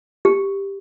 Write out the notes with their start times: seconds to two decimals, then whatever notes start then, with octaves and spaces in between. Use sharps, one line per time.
0.25 G4